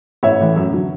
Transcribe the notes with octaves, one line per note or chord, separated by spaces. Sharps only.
A1 C#5 E5
A2 E3
F#2
D3 F#3